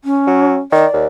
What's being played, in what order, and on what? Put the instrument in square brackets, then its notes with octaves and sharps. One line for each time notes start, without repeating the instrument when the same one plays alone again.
[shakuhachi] C#4
[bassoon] F#3
[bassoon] D#3 [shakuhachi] D5
[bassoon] D#2